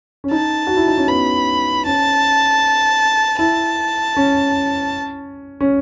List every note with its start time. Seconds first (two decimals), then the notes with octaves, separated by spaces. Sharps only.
0.24 C#4
0.31 D#4 A5
0.67 F#4
0.77 E4
0.88 D#4
0.98 C#4
1.08 B3 B5
1.85 C#4 A5
3.39 E4 A5
4.17 C#4
5.61 C#4